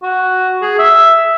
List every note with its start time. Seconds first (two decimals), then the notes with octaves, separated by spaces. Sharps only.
0.03 F#4
0.62 G#4
0.78 E5